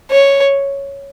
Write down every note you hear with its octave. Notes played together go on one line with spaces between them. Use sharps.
C#5